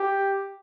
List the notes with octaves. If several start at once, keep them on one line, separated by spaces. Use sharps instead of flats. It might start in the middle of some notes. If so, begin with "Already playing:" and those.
Already playing: G4